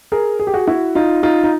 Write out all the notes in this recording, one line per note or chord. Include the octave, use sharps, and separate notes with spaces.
G#4 A#4
G#4
G4
F#4 G#4
E4 F#4
D#4 F4
D#4 F4
D#4